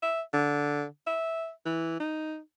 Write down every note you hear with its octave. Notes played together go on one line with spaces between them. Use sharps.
E5
D3
E5
E3
D#4